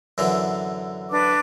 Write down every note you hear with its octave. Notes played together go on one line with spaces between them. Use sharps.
F#2 D3 E3
D4 B4 D6